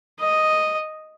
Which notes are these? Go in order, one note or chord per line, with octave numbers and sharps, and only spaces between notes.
D#5